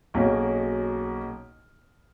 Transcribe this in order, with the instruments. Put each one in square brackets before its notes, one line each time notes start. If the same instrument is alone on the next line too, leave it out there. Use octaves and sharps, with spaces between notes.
[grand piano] B1 B2 A#3 C#4 G#4